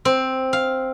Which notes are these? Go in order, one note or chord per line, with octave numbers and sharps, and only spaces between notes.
C4
F5